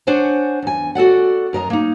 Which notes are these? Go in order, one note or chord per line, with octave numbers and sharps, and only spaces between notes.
D4 C5 C#5 F#5 G#5
E2 G#5
F#4 A4 D5 F#5
F#2 A#4 D#5 A#5
A#3 D#4